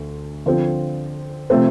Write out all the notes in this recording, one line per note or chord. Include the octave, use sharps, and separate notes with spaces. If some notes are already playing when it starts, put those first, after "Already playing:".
Already playing: D2 D3
D3 F3 C4
C3 F3 A3 C4